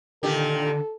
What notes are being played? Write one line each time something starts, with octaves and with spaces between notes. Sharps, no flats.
A#2 D3 D#3 G4 A4